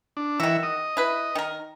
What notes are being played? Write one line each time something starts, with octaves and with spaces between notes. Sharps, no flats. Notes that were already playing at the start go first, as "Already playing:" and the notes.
D4
D#3 E3 F#4 E5
D#5
E4 B4
D#3 A#4